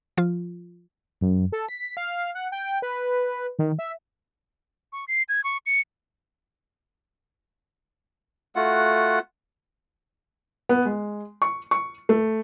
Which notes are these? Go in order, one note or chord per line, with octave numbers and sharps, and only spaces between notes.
F3 F4
F#2
A4
B6
F5
F#5
G5
B4
D#3
E5
C#6
C7
G#6
C#6
C#7
A3 F4 F#4 F#5
B3
G#3
C#6
C#6
A3